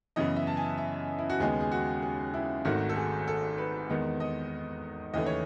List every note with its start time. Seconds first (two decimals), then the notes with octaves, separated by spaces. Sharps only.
0.16 F#2 C#3 E3 B3 D#5
0.36 E5
0.47 A5
0.57 G#5
0.78 E5
1.19 E4
1.30 F#4
1.40 D#2 C#3 G#3 B3 G#4
1.61 G#4
1.72 F#4
2.03 G#4
2.34 E4
2.65 G#1 G#2 D#3 A3 F#4
2.89 A4
2.96 G#4
3.28 A4
3.58 B4
3.90 E2 D#3 G#3 B3
4.20 D#5
5.14 D#2 C#3 E3 A3 D#5
5.26 C#5